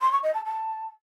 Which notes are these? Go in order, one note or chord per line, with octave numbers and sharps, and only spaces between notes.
C6
C#6
D#5
A5
A5